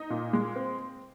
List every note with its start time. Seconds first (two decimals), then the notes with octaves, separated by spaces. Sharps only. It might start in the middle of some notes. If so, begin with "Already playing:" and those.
Already playing: D#4
0.10 A#2
0.33 G#3
0.56 C4